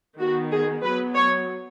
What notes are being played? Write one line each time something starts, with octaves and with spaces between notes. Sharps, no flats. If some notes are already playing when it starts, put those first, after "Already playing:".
D#3 B3 F#4
G#4
F#3 B3 B4
C#5